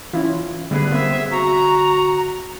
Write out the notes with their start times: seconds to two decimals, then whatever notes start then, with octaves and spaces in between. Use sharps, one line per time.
0.13 E3 C#4 E4 F4
0.71 D3 G3 B3 G#4 B4
0.92 A#3 C4 E5
1.31 F#4 A#5